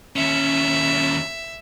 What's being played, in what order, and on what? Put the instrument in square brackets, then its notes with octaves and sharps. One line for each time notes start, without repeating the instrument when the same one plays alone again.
[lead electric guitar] D#2 C#4 [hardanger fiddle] E5